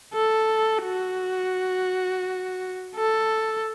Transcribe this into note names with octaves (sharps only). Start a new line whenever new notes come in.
A4
F#4
A4